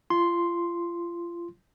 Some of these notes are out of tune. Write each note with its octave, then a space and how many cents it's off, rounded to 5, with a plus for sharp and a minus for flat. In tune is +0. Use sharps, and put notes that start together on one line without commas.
F4 -30 C6 +0